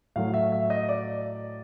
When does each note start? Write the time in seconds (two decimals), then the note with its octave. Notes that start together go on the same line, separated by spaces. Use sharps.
0.16 A2 F#3 A3 F5
0.34 E5
0.52 E5
0.70 D#5
0.89 D5